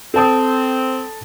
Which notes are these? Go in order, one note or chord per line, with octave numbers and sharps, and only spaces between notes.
C4 A4 A5 D#6